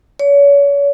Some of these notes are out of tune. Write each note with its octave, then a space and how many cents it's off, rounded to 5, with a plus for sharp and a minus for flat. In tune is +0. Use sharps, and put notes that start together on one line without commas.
C#5 +35